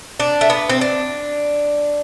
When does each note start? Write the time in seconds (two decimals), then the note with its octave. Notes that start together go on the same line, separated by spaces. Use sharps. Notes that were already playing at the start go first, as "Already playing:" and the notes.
0.20 D4
0.41 A3
0.50 B3
0.69 C4
0.81 D4